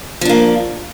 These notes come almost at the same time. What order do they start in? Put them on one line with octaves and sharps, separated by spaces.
F3 D4 A#3